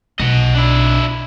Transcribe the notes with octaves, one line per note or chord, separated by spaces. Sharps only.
B1 D#5 F#5
D4 E4